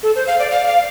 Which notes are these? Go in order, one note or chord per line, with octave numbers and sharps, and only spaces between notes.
A4
C5
F5
D5
F5
F5